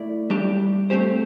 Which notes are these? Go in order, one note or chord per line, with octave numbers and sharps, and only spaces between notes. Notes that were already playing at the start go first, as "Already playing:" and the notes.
Already playing: A3 E4 D5
G3 D4 G4
A3 C4 G4 C5